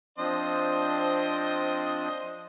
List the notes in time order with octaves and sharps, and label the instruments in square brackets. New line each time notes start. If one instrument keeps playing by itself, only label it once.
[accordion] F3 C4 D4 [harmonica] C5 D#5